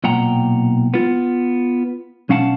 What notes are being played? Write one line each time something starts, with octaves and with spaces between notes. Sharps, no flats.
B1 A#2 F#5 G5 A#5
B3 F4
B1 C#4 F5 F#5 A5